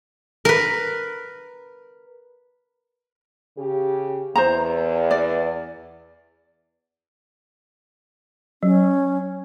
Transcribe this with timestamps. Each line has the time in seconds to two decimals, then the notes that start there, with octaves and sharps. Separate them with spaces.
0.45 A#4 B4
3.57 C#3 G4
4.36 E2 C5 A#5
5.11 D5
8.63 F#3 C#4